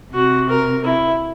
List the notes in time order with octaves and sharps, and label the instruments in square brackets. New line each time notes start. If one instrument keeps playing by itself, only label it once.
[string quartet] C3 [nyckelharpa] F#4
[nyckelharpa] A#4
E4